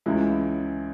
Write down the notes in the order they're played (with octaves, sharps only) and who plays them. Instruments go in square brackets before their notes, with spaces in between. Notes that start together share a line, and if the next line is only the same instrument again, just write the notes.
[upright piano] C#2 C#3 E3 G#3 E4